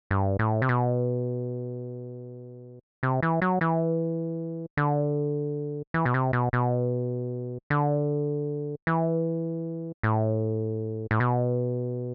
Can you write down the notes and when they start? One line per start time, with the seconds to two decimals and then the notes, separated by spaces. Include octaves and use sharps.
0.11 G2
0.39 A2
0.62 C3
0.69 B2
3.03 C3
3.23 E3
3.42 F#3
3.61 E3
4.77 D3
5.94 E3
6.05 B2
6.14 C3
6.33 B2
6.53 B2
7.70 D3
8.87 E3
10.03 A2
11.11 A2
11.20 B2